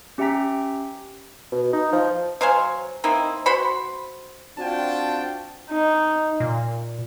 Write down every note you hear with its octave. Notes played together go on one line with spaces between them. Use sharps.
C#4 G4 E5 G5 A#5 B6
B2
D#4
F3
F#3 C5 F5 G#5
A#3 C4 D#4 E4
F#4 C5 F#5 B5
C4 D4 F4 F#4 G5 A5
D#4
A#2